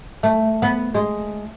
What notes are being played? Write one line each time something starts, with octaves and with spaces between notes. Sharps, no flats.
A3
B3
G#3